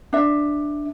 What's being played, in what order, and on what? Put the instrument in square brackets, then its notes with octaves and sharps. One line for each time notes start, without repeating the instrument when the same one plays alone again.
[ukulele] D4 E5